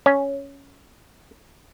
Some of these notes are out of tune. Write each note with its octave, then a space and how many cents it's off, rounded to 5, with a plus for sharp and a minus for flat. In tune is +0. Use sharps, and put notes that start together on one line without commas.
C#4 +5